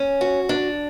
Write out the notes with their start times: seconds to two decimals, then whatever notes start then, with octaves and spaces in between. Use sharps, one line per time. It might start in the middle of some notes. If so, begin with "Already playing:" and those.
Already playing: C#4
0.21 F#4
0.49 D4